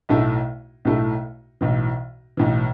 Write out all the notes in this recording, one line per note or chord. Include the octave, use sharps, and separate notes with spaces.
B1 A2 A3 E4
B1 A2 A3 E4
B1 A2 E3
B1 A2 E3